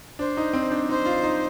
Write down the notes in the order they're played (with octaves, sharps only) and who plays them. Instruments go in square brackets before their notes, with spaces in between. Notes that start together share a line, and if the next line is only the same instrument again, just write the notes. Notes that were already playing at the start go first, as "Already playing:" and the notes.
[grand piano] D4 [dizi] C5
[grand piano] D#4
C4
D4
[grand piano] D#4 [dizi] C5
[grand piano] F4
D#4